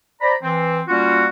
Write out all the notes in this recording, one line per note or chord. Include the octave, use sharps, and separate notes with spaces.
C5 D5 A#5 B5
E3 C4
G3 A#3 C#4 F4 F#4